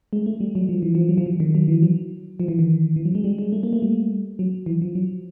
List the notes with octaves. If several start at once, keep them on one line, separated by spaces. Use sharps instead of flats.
G#3
A3
G3
F#3
F3
E3
F3
F#3
F3
E3
D#3
F#3
E3
F#3
F3
E3
D#3
E3
F#3
G#3
G3
G#3
A3
A#3
A3
G3
F#3
E3
F3
F#3